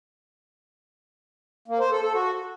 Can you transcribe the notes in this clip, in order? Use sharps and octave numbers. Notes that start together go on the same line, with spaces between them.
A#3
C5
A4
A4
F#4